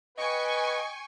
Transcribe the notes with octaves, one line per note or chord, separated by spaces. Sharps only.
B4 D#5 G5 G#5 C#6